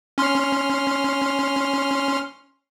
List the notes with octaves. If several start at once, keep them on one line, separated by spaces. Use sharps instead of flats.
C#4 C6 F6